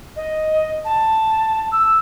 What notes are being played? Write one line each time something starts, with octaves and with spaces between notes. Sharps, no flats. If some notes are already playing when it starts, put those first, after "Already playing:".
D#5
A5
E6